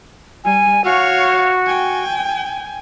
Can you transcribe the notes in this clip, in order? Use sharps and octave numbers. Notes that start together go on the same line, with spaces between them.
G3 G#5
F#4 C#5 F5
G5 G#5